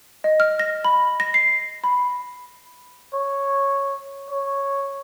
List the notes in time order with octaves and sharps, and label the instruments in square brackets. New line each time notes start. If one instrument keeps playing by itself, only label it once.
[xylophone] D#5
F6
A#6
B5
A#6
C7
B5
[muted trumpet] C#5
C#5